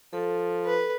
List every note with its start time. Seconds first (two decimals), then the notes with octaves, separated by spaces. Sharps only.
0.13 F3 A4
0.66 B4